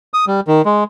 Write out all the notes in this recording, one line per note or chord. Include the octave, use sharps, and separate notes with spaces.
D#6
G3
D#3
G#3